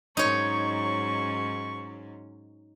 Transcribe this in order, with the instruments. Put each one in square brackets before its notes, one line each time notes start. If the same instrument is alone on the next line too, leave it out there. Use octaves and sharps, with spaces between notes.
[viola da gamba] G#2 F#3 C#4 [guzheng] D#4 C#5 [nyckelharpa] C#6